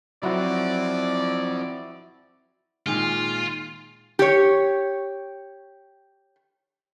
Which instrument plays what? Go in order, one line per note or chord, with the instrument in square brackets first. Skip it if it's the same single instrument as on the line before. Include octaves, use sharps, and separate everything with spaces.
[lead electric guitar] F3 C4 [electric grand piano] F#3 [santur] E4 F#4 C5 [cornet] D5
[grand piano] A#2 D#3 G#3 [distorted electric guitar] F4
[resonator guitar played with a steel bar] G4 C#5